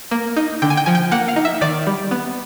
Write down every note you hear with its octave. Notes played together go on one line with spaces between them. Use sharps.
A#3
D#4
D3 G5
G#5
G5
F3 G#5
G5
A#3 F#5
F5
D#4
E5
D#3 D5
G3
B3